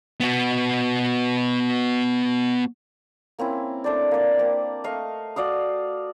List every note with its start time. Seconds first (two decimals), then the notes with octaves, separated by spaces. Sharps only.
0.20 B3 F#4
3.39 A#3 C4 C#4 E4
3.84 A3 D4 C5 D5
4.11 A#3 D5
4.39 A#3 C4
4.84 A3 D#5 F5 C#6
5.36 F#4 D5 F5 D#6